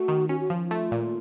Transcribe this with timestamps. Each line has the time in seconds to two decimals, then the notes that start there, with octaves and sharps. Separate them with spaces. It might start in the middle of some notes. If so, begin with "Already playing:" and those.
Already playing: A3 F#4
0.08 D#3
0.29 C#4 F#4
0.40 F#4
0.50 F3
0.60 F4
0.71 A3
0.91 A#2